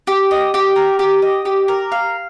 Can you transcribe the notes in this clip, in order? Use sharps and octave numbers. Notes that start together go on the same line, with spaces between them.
G4
D#5
G4
A#4
G4
D#5
G4
A#4
F5